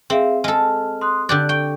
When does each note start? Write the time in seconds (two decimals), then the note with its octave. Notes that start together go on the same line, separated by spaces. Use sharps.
0.10 C4 G#4 E5 F5
0.44 G#3 A4 F6
1.01 C6 D#6 F#6
1.29 D3 G4 D5 F#6
1.49 G5 C#6